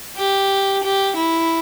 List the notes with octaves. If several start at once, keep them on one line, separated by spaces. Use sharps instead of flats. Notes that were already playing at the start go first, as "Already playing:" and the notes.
G4
G4
E4